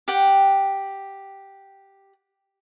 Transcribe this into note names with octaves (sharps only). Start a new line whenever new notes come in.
G4 F#5 G5